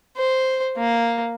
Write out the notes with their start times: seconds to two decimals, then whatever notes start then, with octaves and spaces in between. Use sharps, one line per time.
0.17 C5
0.77 A#3